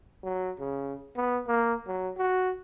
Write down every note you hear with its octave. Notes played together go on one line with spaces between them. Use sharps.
F#3
C#3
B3
A#3
F#3
F#4